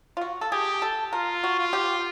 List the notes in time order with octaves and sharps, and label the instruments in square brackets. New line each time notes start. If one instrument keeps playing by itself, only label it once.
[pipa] F4
F#4
A4
[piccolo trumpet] G4 [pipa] G#4
[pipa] A4
[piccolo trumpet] F4 [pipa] A#4
[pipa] F#4
[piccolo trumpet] F4
[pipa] G4